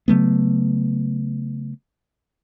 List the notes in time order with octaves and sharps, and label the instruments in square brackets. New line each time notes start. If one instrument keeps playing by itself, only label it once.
[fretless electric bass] C#3 F#3 A3 B3